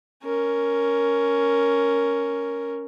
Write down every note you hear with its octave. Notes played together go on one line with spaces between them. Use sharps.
C#4 A#4